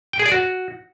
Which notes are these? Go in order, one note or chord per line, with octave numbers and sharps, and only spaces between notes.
G5
G#4
D5
F#4